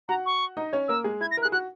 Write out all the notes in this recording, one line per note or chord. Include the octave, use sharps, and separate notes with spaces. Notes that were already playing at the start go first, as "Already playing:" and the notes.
F#4 F#5 A#5
C#6
D#4 D#5
C#4 C#5
A#3 A#4 E6
G#3 G#4
E4 G#6
A#6
A#4
F#6
G#4
F#4 F#6